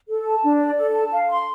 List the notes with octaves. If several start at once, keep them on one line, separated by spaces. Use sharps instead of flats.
A4
A5
D4
D5
A4
A5
F5
C6